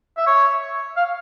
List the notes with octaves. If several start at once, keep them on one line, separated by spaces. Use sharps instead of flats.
E5
C#5
F5